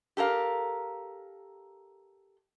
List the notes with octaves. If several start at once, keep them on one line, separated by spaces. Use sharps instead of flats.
G4 A4 A#4 F5